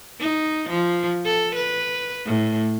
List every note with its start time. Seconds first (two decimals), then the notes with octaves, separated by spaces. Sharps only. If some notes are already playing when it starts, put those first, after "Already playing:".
0.20 D#4
0.69 F3
1.25 A4
1.55 B4
2.26 A2